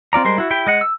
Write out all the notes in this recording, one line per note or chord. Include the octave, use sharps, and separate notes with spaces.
C4 F4 D5 A#5
G3 G#3 A#4 C5
E4 F#4
E4 G4 G5
G#3 D#5 F#5
E6